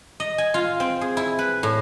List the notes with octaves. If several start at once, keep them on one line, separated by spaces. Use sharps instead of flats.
D#5
G#5
F4
C4
G#4
E4
B4
A2